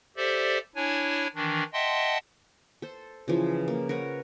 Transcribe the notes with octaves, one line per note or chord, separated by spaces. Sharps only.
G4 A4 C5 D5 E5
D4 E4 C#5 G#5
D#3 E3 D4
D#5 E5 F#5 G5 A5 C6
A4 C5
C#3 E3 F3
A#3
A#4 B4 C#5 F#5